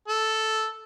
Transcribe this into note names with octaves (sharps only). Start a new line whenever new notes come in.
A4